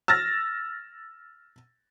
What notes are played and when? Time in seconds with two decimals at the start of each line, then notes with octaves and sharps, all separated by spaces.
0.08 E6 F6 A6 A#6